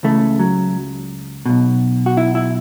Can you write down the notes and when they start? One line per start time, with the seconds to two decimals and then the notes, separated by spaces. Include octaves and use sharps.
0.03 C#2 C#3 E3 A3
0.39 F#3
1.46 B1 B2
2.06 F#4
2.17 E4
2.35 E4